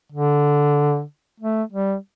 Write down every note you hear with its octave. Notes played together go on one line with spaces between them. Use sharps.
D3
A3
G3